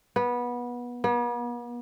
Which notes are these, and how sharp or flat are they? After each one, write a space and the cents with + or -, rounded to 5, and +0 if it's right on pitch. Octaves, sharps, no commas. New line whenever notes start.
B3 -20
B3 -45